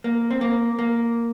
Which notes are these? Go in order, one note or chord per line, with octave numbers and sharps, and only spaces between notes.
A#3
C4
A#3
A#3